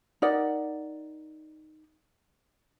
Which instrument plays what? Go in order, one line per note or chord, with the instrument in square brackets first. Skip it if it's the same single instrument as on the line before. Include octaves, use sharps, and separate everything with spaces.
[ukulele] D#4 A#4 D5 F#5